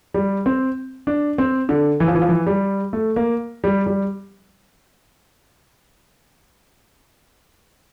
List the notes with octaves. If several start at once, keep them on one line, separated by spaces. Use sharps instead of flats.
G3
C4
D4
C4
D3
E3
F3
E3
F3
E3
G3
A3
A#3
G3
G3